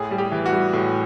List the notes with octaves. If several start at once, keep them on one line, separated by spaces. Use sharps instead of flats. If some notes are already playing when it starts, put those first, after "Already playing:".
Already playing: A2 G#4
G3
G4
E3
F#4
G3
A2